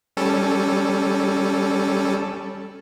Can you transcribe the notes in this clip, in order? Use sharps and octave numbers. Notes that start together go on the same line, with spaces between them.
G3 C#4 A4